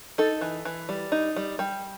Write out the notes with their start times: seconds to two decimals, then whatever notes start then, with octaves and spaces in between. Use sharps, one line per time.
0.18 D#4 A4
0.41 E3
0.65 E3
0.89 G3
1.12 D#4
1.36 G3
1.59 G3